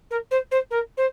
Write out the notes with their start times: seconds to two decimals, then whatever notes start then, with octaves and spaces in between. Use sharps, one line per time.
0.11 A#4
0.31 C5
0.51 C5
0.71 A#4
0.97 C5